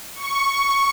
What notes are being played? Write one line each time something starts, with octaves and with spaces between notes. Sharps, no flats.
C#6